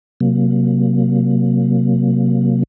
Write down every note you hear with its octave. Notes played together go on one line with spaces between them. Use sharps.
C3 F#3 A#3